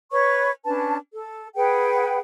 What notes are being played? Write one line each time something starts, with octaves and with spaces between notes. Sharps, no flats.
B4 C#5 C#6
C#4 D4 B4 A5
A4
G#4 B4 F#5 G5